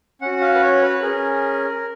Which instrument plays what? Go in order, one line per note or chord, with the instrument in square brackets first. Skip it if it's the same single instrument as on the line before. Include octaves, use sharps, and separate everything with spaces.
[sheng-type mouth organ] C#4 F#4 F#5
F5
B4
C#5
B4
C#4 G#4 A#4